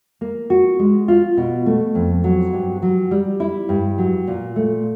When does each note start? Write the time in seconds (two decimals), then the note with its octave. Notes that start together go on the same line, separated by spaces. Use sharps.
0.21 A#3
0.50 F#4
0.79 G#3
1.08 F4
1.37 B2
1.66 A3
1.95 F2
2.24 F#3
2.53 G2
2.82 F#3
3.11 G3
3.40 E4
3.69 G2
3.98 F#3
4.27 A#2
4.56 A3